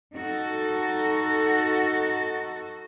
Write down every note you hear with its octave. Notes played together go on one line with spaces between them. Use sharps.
D#4 F#4 A4